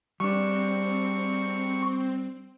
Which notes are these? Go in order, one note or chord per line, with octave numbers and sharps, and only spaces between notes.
G3 C4 D4 C#6